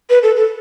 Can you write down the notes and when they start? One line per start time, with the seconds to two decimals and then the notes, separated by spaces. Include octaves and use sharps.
0.10 B4
0.23 A4
0.36 A4